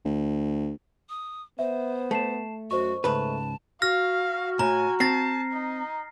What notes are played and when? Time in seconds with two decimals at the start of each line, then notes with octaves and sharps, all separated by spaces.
0.05 D2
1.09 D#6
1.59 B3 C5 E5
2.11 A3 A5 C7 E7
2.71 F#2 F#4 C5 D#5 C#6
3.04 C#2 G#2 A3 B4 A5
3.82 F#4 F5 F6 A#6
4.59 A2 G#5 A#5
5.00 C4 A5 A6 A#6 C7
5.52 D#4